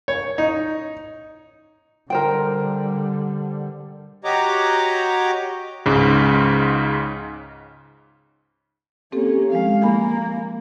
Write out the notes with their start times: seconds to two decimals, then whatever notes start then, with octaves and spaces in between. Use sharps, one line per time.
0.08 C#5
0.38 D#4
2.10 D3 G3 A#4 C5 G5
4.24 F#4 G4 C#5 D#5 A#5 D6
5.86 C#2 G#2 C#3
9.12 A#3 C4 C#4 G4 A4
9.52 F3 G#3 F5
9.81 A#3 F5 G#5 B5